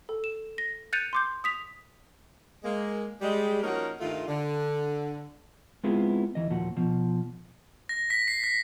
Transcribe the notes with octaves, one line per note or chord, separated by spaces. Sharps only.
A4
E7
A#6
F#6 G6 A6 C#7 D#7 F7
C6 D6 G6
D#6 B6 F7
G#3 A#3
G3 G#3
F3 A#3 C#4 D#4 F#4 A#4
G2 D#3 A3 F4
D3
G#3 B3 C4 E4 F4 G#4
D#2 E3 D#5
D#2 A#2 F3 F#4
B2 F3
A#6
B6
C7
A#6